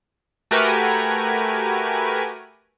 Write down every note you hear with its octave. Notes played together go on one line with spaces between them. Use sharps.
A3 F#4 G4 A#4 B4 G#5